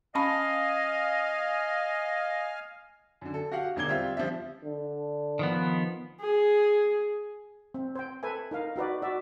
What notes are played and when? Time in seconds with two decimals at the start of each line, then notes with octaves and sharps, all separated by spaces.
0.15 C#4 D#5 F5 G#5 A5 B5 F6
3.21 F#2 D3
3.34 A4
3.51 F#4 G4 F5 F#5
3.76 E1 D3 A#3 D6 G#6 G7
3.88 G3 C4 F4 G4 E5
4.17 F3 G3 D4 E5
4.65 D3
5.39 D#3 F3 B3
6.20 G#4
7.74 C4
7.95 C5 G5
8.23 A4 B4 E5 G#5
8.51 D#4 A#4 F5
8.76 D#4 F#4 B4 D5
9.02 F#4 D5 E5